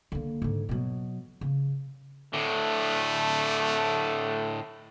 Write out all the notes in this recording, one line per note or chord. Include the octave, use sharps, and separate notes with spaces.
D3 A#3
G#2 D3
B2 F#3
C#3
A2 D3 A3